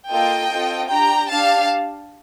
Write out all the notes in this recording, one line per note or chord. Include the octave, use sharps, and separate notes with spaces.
A#3 F4 A4 D#5 G5
C4 F4 A4
D4 G4 G5 A#5
D4 G4 F5 A5